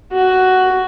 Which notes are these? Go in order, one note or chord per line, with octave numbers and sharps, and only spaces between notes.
F#4